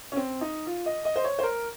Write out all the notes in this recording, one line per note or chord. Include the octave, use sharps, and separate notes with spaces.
C#4
C4
D#4
F4
D#5
D#5
C5
C#5
C5
A#4